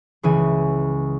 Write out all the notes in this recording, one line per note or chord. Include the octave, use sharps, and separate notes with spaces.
C#2 C#3 E3 G#5